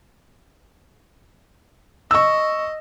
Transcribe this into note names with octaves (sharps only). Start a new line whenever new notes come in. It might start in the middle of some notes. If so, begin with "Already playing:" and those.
D#5 C#6 E6